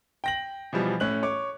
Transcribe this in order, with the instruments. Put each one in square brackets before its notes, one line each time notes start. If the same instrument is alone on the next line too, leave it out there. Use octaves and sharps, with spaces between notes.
[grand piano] G5 A#6 F#7
B2 E3 F3 G3
A2 C#4 F#6 F#7
C#5 C#6 D6